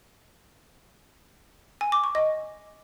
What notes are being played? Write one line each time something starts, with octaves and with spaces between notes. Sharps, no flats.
G#5
D6
C#6
D#5